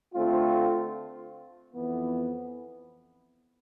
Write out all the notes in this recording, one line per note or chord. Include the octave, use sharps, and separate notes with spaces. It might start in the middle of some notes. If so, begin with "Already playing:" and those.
D3 A3 C4 F4
F2 E3 B3